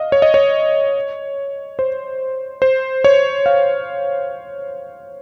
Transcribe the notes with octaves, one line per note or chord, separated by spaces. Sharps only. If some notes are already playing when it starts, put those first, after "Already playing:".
Already playing: D#5 F5
C#5
D#5
C#5
C5
C5
C#5
F5